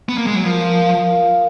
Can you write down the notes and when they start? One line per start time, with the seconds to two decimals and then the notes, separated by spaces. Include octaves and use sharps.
0.09 B3
0.18 A#3
0.27 G#3
0.35 F#3
0.45 F3 A#4
0.61 F5
0.77 A#4
0.94 F5
1.11 F4
1.28 F5